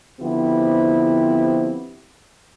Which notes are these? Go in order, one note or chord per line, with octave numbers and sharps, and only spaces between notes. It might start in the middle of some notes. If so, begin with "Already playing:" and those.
D3 F3 B3 C4 E4 G4